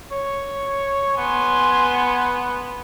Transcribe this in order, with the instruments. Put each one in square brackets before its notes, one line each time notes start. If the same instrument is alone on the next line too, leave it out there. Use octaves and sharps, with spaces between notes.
[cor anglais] C#5
[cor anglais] B3 [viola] G#5 C6